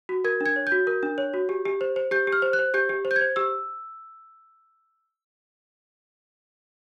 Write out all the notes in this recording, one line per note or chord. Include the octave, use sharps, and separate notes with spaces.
F#4
A#4 G#6
D4 G#6
C#5
G6
F#4
A#4
D4
C#5
F#4
G4
G4
C5
C5
G4 G6
G4
F6
C5
F#6
C5
G4 G6
G4
C5
G6
G#6
C5
G4 E6